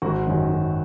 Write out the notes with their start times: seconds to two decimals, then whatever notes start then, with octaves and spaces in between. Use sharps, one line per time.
0.02 G#1 F#4
0.26 F#2 D#3 F#3
0.49 G#1